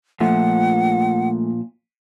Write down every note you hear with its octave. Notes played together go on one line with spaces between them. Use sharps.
A#2 F3 A3 F#5